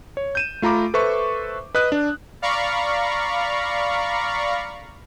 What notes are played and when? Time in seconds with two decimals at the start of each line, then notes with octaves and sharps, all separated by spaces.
0.17 C#5
0.35 G6 D#7 E7
0.62 A3 F4 A#5 B5 D6
0.94 A4 B4 C5 E5 C#6
1.75 B4 D#5 D#6 F#6
1.92 D4
2.42 D5 F5 A#5 B5 C#6